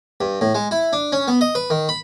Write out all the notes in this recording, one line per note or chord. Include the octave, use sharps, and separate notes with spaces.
G2
A2
G#3
E4
D4
C#4
B3
D#5
B4
D#3
B5